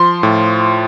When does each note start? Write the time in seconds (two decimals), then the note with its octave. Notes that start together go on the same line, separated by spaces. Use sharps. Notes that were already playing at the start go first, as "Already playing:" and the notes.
Already playing: F3 C6
0.23 A2